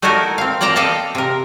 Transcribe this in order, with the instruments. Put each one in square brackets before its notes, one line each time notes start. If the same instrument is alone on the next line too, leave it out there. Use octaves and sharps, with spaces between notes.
[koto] A3 D#4 E4 F#4 A4 A#4
C4 F5
A#3 D5 G5 A5 A#5
A4 D#5 F5 G5 A5
C3 A#4